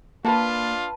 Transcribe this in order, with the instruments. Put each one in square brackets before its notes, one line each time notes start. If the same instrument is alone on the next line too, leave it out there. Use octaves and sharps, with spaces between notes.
[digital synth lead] A#3 [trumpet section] D4 F4 [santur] B4 A5